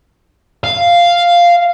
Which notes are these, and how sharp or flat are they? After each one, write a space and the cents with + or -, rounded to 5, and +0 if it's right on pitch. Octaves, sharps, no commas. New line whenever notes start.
F5 -5